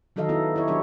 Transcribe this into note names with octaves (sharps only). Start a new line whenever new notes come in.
D#3 F#3 D#4 A4 D#5 F5
B3 E4 A4
E4 G4 C#5
F#3 D4 C5 C#5